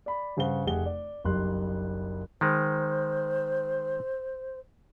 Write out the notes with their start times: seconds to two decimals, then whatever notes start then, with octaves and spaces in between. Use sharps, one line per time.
0.06 D5 B5
0.37 G2 C#3 C5 F#5 G7
0.66 F1 A3 G4 G#4 F#5 G7
0.86 D5
1.24 F#1 B1 G3 C6 F#6
2.41 D#3 G#3 C5